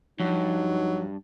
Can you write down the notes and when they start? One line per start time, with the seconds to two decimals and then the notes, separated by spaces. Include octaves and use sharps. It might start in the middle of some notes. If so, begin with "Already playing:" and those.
0.20 G2 F3 F#3 D#4